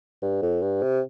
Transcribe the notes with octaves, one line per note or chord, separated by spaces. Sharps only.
G2
F2
G2
C3